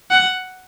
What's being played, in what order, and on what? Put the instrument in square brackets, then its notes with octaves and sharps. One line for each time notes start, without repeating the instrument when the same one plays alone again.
[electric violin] F#5